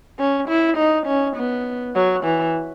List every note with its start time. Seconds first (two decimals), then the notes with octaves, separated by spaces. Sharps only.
0.19 C#4
0.49 E4
0.77 D#4
1.07 C#4
1.36 B3
1.95 F#3
2.24 E3